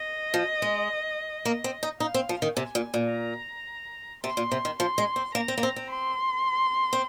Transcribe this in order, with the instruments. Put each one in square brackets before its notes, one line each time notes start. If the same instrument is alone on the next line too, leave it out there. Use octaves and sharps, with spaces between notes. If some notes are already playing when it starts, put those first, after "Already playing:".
Already playing: [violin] D#5
[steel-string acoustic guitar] F3
G#3
A#3
C4
D#4
[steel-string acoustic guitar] D#4 [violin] F5
[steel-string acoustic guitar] C4
F3
D#3
[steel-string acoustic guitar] C3 [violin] G#5
[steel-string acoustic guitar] A#2
A#2
[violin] A#5
[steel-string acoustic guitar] C3 [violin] C6
[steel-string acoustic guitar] A#2
C3
D#3
[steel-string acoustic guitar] F3 [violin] C6
[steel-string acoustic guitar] G#3
C4
[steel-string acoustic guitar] A#3 [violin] A#5
[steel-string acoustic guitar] C4
A#3
C4
C4
[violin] C6
[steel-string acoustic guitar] C4